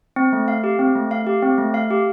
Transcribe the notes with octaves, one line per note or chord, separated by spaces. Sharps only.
C4
A3
F5
G4
C4
A3
F5
G4
C4
A3
F5
G4